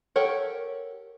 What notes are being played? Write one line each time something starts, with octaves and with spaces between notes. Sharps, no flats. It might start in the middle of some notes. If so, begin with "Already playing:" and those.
G4 A4 A#4 C#5 F#5